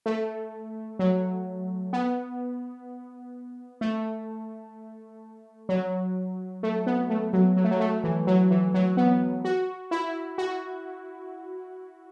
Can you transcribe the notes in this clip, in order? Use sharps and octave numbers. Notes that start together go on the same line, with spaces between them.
A3
F#3
B3
A3
F#3
A3
B3
A3
F#3
F#3
A3
F#3
A3
E3
F#3
E3
F#3
B3
F#4
E4
F#4